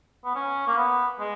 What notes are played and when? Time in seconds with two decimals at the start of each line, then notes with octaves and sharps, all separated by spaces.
0.25 B3
0.35 C#4
0.67 A#3
0.78 B3
1.19 G#3